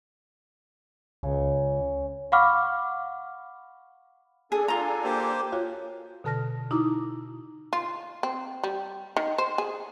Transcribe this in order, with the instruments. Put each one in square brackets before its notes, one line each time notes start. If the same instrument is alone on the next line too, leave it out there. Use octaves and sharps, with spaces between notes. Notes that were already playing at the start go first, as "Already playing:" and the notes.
[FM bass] C#2 [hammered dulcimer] C#3
[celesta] F5 F#5 B5 C#6 D6 F6
[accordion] D4 A4 G#5 [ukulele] G#4
[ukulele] F4 A#5
[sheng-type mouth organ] A#3 G4 C5
[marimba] F4 F#4 C#5 F5
B2 D3 A4 A5 F6 A#6
D#4 E4 F#4 A#5 D6 D#6
[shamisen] F4
C4
G3
D#3
C5
G#4